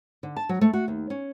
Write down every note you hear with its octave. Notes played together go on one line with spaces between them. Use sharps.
D3
A5
F#3
A3
F#4
D#2
C#4